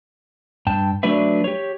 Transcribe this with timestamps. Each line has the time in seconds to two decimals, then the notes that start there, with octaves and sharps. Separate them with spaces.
0.67 G2 G5 A5
1.03 F#3 A3 D4 B4 D5 E5
1.44 G4 C#5